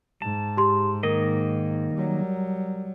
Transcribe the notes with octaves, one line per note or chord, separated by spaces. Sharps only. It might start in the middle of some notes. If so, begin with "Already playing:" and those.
G#2 A5
G4 C6
D#3 A#3 A#4 D#5
F#3 G3